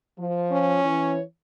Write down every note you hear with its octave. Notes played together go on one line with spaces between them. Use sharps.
F3
C#4
E3 C#5